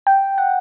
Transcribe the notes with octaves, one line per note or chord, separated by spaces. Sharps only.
G5
F#5